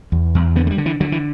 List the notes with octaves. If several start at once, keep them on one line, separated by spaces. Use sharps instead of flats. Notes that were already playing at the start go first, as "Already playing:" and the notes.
E2
E2
D3 B3
A3
G3
D3
E3
D3 F#3
E3